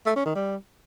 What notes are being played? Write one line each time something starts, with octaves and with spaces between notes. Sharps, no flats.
A3
C#4
D#3
G3